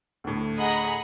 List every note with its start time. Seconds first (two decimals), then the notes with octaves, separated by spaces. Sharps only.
0.24 D2 A2
0.58 G#4 D#5 F#5 A#5 B5